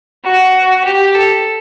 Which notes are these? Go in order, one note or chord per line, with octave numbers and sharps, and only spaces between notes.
F#4
G4
A4